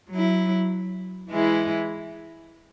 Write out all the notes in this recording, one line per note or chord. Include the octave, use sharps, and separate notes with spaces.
F#3 E4
E3 G#3 E4